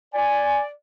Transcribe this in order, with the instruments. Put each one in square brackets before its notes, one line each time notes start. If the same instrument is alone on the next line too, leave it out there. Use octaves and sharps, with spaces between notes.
[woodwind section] D5 [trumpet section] G#5